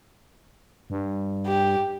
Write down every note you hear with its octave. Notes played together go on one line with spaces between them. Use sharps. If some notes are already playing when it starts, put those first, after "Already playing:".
G2
G4